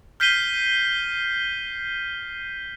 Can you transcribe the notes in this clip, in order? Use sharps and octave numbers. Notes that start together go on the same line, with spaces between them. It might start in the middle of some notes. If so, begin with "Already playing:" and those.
F6 G6 B6 C7 D#7 G7